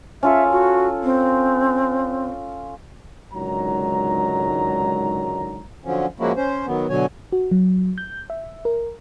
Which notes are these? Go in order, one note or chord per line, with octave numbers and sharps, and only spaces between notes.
C#4 F4 A4 E5
F#4
C4
C#2 G#2 D3 D#3 F#3 A#5
D3 F3 F#3 C#4
F3 G#3 A#3 C#4 E4 F#4
C#4 C5
D#3 F#3 B3
B2 D3 F#3 C#5 G#5
F#4
F#3
G6
E5
A#4